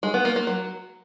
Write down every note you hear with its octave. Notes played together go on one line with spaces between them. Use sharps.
G#3
B3
A#3
A#3
F#3